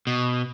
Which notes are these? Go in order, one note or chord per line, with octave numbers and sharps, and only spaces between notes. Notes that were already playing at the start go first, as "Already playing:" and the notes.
B2